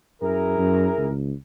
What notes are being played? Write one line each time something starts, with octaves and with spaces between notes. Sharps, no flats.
F#2 E4 G#4 A#4
F#2
C#2